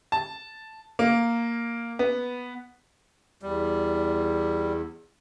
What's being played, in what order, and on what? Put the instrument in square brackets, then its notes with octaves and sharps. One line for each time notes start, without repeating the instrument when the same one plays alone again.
[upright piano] A5
A#3
B3
[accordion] E2 [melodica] G3